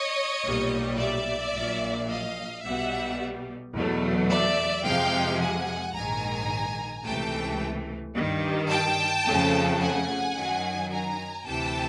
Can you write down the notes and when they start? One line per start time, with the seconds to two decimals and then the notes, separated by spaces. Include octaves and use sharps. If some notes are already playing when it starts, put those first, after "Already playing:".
Already playing: C#5 D#5
0.45 B1 A#2 G3
0.99 D5 E5
1.54 A#1 A#2 F#3
2.09 D#5 F5
2.64 B1 B2 G3 E5 F#5
3.74 E2 B2 F#3 A3
4.29 D5 E5
4.85 F2 C3 F3 G#3 F5 G5
5.40 F#5 G#5
5.95 A#1 G#2 D#3 G#5 A#5
7.05 C#2 C3 E3 A3 G5 A5
8.16 G2 D#3 G3
8.70 G5 A5
9.25 F2 C#3 F3 A3
9.81 F#5 G#5
10.35 F#2 D#3 F#3
10.91 G#5 A#5
11.46 D2 C3 E3 G5 A5